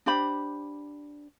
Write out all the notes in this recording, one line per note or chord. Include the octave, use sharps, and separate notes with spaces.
D4 G4 C5 B5